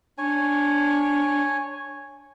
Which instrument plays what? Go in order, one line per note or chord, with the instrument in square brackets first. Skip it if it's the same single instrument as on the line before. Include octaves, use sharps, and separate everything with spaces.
[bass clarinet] D4 [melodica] C#5 G#5